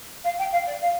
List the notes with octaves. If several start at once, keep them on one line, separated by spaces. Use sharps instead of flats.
F5
G5
F5
D5
F5